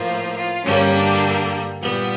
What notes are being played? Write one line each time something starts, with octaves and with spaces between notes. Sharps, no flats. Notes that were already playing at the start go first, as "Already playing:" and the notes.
Already playing: A2 F3 A#3 F4
F4
G2 D3 G3 A#3 C#4
D4
A#2 G3 B3